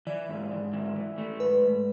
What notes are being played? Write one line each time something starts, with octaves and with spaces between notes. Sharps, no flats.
E3 D5
G#2
G#2
E3
E3
A3
G#2 B4
G#2